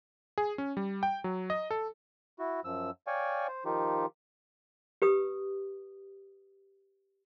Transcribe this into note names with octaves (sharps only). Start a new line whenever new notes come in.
G#4
C#4
G3
G5
F#3
D#5
A4
E4 F#4
F#2 F3 E6
C#5 D5 F5 G5 G#5 C#6
C5
D#3 F3 D#4 F4 G4
G4 B4 D#6